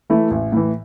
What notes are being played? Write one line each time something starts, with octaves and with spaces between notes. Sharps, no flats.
E3 A3 E4
A1
A2 E3